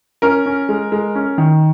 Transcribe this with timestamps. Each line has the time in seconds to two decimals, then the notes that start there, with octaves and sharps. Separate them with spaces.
0.22 C#4 A#4
0.46 C#4
0.69 G#3
0.92 G#3
1.15 C#4
1.38 D#3